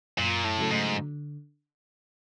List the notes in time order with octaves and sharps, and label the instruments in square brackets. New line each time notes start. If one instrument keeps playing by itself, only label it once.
[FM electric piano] F#2 [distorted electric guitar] A#2
[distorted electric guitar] A2
[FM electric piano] C#3 F#3 A3
[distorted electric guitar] G#2
[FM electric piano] D3